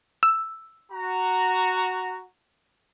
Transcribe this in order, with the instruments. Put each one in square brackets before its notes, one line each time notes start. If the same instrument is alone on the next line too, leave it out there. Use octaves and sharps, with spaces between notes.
[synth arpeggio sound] E6
[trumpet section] F#4 A#5